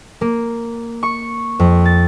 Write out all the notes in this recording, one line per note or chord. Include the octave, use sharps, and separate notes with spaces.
A#3
C#6
F2
A6